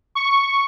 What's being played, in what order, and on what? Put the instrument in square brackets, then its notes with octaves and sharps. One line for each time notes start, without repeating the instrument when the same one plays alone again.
[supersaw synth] C#6